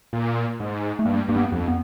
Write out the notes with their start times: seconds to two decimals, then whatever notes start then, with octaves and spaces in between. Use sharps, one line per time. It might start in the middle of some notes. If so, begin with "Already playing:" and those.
0.13 A#2
0.60 G#2
0.99 A3
1.05 G2 A#3
1.28 G2 A#3
1.37 B3
1.52 F2
1.68 B3